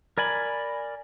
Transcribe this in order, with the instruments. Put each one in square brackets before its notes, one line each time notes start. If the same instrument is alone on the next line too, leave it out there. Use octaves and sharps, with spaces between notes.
[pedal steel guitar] A#4 D5 G#5 B5